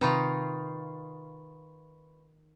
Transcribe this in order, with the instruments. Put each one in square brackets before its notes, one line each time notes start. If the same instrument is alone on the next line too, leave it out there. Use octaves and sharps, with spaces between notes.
[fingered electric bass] C3 C4 [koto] D#3 D#4 F4 [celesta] B4 B5 C#6